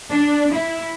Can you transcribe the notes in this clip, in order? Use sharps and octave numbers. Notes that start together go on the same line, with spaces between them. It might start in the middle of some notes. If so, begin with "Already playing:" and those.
D4
E4